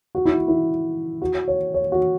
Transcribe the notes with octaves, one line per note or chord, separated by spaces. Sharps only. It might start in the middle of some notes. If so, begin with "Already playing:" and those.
F#4
E4
E4
F#4
C#5
C#5
F#4